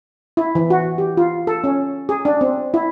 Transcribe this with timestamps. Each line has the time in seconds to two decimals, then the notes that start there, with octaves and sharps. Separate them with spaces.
0.37 E4
0.55 E3
0.70 F#4
0.98 G4
1.17 F4
1.47 A4
1.64 C#4
2.09 G#4
2.25 D4
2.41 C4
2.74 E4